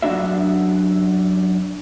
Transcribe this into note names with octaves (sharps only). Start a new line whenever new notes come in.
F#2 D#3 D4 F#4 E5